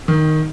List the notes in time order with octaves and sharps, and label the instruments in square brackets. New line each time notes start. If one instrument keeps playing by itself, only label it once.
[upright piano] D#3